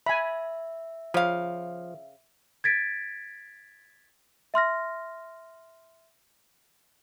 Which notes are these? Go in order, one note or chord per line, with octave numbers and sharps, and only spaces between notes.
E5 G#5 B5
C#3 F3 F5
G#6 A6 B6 D7
E5 C6 F6 A#6